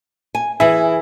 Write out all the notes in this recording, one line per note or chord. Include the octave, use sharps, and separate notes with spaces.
G#5
E3 E4 G#4